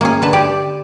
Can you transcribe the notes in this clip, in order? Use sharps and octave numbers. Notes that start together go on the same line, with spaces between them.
A#3 C#4 G#4
D3 B4 A5
G4 D5